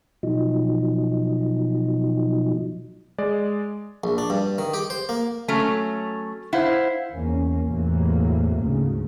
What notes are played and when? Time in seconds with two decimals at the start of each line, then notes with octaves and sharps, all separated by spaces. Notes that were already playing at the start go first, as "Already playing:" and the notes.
0.23 B2 F3 F#3 D#4
3.18 G#3 D5
4.04 A#1
4.18 D4
4.30 G2
4.58 D#3
4.74 G4
4.90 C5
5.09 A#3
5.48 F#3 A3 C#4
6.53 E4 C5 F5 F#5
7.13 E2 A#3 C#4
7.70 E2 A2 C3 E3 F#3 A#3
8.59 D2 G#2 C#3